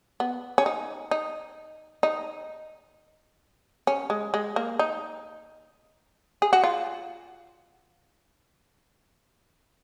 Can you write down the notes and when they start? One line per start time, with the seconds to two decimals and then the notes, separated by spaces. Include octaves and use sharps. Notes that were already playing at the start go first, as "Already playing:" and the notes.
0.20 B3
0.58 C#4
0.66 D#4
1.11 D#4
2.03 D#4
3.87 C#4
4.10 G#3
4.34 G#3
4.56 A#3
4.79 D#4
6.42 G#4
6.53 F#4
6.64 F4